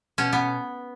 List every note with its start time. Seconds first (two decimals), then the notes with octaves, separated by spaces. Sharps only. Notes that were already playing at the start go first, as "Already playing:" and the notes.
0.18 B2 C#4
0.33 B3